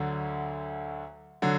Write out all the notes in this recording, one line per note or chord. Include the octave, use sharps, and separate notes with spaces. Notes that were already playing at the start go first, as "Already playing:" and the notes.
Already playing: D2 D3 F#3
D3 F#3